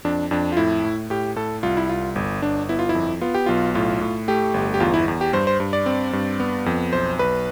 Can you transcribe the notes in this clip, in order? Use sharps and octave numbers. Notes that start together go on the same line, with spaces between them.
F2 D4
F2 D4
F4
A2 E4
A2
A2 G4
A2 A4
C2 F4
E4
C2 F4
G1
G1 D4
B3 E4
F4
E4
F2
B3 F4
G4
B1 F4
A2 F4
A2
A3 G4
G1
G4
E2 F4
E4
E2
G4
G2 C5
C5
G2
D5
C4
G2
B3
F2
B1 C5
B1 B4